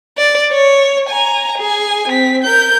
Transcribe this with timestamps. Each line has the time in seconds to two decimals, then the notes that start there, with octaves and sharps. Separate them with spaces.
0.18 D5
0.52 C#5
1.09 G#5 A#5
1.58 G#4 G#5
2.08 C4 B6
2.44 A#4 G6